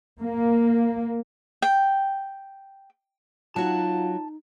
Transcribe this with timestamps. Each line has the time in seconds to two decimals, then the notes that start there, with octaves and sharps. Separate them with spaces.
0.20 A#3
1.62 G5
3.56 F#3 D#4 F4 F#4 A5